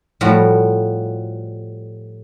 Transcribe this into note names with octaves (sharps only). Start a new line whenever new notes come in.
A2 F3 G3 F4 F#4